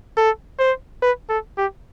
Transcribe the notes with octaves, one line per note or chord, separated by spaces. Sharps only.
A4
C5
B4
A4
G4